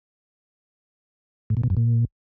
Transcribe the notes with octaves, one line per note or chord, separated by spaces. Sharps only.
A2
A#2
B2
F#2
A#2